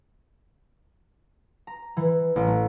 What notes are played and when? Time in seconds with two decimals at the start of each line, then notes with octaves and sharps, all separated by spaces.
1.67 A#5
1.97 E3
2.36 A1
2.47 A3